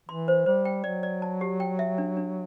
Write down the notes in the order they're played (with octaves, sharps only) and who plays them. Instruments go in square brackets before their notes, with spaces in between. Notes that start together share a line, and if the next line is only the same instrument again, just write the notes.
[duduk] E3 [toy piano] C6
[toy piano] C5
[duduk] G3 [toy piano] C5
[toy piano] G5
[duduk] F#3 [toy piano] D5
[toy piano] D5
A5
G4
G5
E5
D4
D4